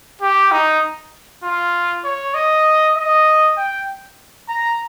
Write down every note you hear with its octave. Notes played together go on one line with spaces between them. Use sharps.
G4
D#4
F4
C#5
D#5
D#5
G5
A#5